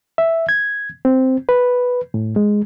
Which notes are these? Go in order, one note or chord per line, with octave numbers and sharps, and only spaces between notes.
E5
G#6
C4
B4
A2
G#3